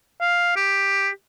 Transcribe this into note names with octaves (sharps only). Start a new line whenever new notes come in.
F5
G4